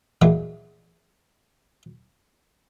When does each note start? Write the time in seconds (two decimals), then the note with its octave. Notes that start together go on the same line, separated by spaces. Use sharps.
0.22 A#2 E3 F#3 G#3